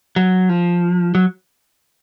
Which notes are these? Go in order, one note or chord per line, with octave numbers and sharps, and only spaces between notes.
F#3
F3
F#3